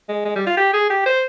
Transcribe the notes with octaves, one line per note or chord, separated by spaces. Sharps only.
G#3
G#3
G3
F4
G4
G#4
G4
C5